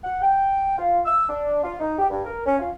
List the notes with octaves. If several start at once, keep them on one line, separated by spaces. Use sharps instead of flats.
F#5
G5
F4
E6
D4
F4
D#4
G4
G2
A#4
C#4
F4